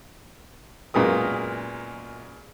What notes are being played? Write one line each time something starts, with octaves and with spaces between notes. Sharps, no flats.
F#2 A#2 G#3 B3 A#4 D#6